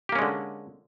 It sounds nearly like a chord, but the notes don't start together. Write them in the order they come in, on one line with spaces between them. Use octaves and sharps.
G4 A#3 C#4 G#3 D3